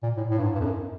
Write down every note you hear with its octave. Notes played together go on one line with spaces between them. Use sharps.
A#2
A2
A2
G2
G#2
G2
F2
F#2